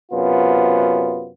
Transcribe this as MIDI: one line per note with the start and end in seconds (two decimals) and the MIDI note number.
0.12 1.30 42
0.12 1.30 48
0.12 1.30 59
0.12 1.30 65